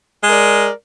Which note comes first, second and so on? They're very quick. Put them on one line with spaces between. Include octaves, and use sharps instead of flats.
G#3 A#4 D5